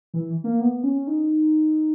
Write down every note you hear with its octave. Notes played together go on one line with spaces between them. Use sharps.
E3
A#3
B3
C#4
D#4